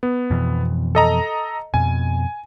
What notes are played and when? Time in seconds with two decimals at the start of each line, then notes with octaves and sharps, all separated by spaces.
0.03 B3
0.31 F2 B2 E3
0.95 A4 D#5 A#5
1.74 F2 B2 G#5